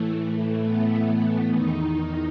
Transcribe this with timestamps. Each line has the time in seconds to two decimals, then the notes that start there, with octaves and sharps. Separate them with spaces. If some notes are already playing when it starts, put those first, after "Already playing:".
Already playing: A2 E3 A3
0.17 A3
0.63 B3
1.52 E2 D#3 D#4